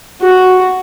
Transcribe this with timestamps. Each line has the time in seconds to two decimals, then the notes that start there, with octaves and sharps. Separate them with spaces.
0.22 F#4